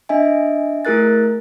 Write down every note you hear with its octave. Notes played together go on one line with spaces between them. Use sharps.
D4 D#5 E5 G#5
A3 E4 G#4 A#4 F#6 A6